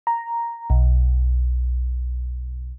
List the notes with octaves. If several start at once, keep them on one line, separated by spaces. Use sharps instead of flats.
A#5
B1